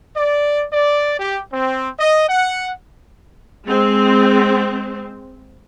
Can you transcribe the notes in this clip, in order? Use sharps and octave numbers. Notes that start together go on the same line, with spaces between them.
D5
D5
G4
C4
D#5
F#5
G#3 C4